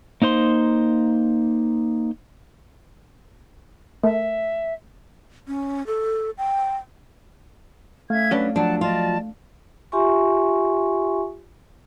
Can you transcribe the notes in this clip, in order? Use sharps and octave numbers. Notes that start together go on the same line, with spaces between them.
A#3 D#4 C5 C6
A3 A#4 E5 A5
C#4
A4
G5
A3 C#4 E5 F5 G#6
F#3 C#4 D4 B4
F3 F#3 D4 F#5 A5
F4 D5 D#5 A5
F4 G4 E5 G#5 C6 C#6